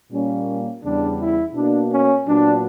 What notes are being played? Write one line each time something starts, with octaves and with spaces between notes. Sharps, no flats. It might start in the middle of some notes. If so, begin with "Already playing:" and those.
A#2 G3 A#3 C#4
E2 C#3 G3 B3 D4
E4
B2 A#3 D4
C#4
A#2 F#3 B3 D4